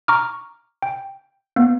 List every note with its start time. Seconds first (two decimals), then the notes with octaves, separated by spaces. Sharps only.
0.08 A#5 C#6 D6 F6
0.82 G5
1.56 A#3 B3